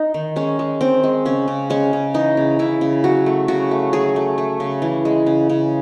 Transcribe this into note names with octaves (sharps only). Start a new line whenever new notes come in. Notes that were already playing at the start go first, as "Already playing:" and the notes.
Already playing: D#4
D#3
G#3 C#4
G#3
D#3 C4
G#3
C#3 C#4
C#3
G#3 C#4
C#3
E3 D#4
C#3
C#3 E4
C#3
F#3 F#4
A3
C#3 F#4
A3
F#3 G#4
A3
A3
C#3
E3
G#3
C#3
C#3